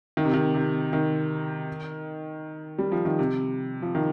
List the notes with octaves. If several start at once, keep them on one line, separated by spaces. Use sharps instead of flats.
D#3
C3
D#3
C3
D#3
G3
F3
D#3
C3
F3
D#3